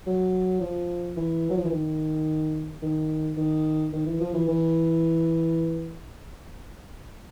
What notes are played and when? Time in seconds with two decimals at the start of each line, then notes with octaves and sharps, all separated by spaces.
0.06 F#3
0.61 F3
1.17 E3
1.50 F#3
1.57 F3
1.64 E3
1.72 D#3
2.82 D#3
3.37 D#3
3.93 D#3
4.06 E3
4.20 F3
4.34 E3
4.48 E3